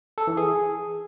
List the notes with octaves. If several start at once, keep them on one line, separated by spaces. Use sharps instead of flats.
A4
E3
G#4